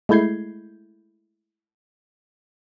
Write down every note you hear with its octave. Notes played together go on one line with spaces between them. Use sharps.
G#3 A3 E4 G6 G#6 C7